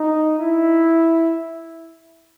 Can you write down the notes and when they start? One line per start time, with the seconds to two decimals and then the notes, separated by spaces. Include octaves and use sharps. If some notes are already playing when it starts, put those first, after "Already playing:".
Already playing: D#4
0.39 E4